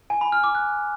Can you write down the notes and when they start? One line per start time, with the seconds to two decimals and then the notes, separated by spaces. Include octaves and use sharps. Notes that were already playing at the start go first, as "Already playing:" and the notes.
0.10 G#5
0.21 B5
0.32 F6
0.44 D6
0.55 F#6